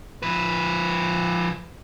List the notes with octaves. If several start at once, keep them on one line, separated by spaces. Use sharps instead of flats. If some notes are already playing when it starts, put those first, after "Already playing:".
F3 B4